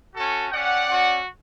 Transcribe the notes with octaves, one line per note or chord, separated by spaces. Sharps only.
C#4 F#4 A4
C#4 G4 D5 F#5
C#4 F#4